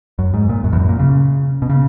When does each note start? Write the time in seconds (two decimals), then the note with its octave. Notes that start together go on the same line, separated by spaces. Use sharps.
0.19 F#2
0.34 G#2
0.49 A#2
0.64 F#2
0.72 E2
0.79 F#2
0.89 A#2
0.99 C#3
1.62 B2
1.70 C#3